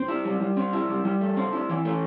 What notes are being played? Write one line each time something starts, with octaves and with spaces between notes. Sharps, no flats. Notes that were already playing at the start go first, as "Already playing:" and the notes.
Already playing: C4
E4
G3
G3
C4
E4
G3
G3
A3
C4
E4
E3
A3